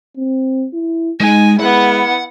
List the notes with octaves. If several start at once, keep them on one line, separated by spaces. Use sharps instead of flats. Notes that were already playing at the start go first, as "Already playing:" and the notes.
C4
E4
G#3 D#4 G#5
G#3 B3 E4 F#5